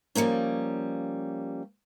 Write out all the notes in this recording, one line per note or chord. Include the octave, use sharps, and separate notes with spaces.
F3 G3 G#3 A#3 C#4